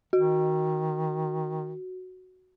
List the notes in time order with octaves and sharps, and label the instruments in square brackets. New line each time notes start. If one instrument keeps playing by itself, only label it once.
[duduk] D#3 [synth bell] F#4